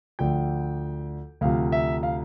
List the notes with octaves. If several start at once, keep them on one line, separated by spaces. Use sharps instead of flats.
D2 D3 F3 G5
D2 C3 F3 F5
E5
F5